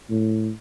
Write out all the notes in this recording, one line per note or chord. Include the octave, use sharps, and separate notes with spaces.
A2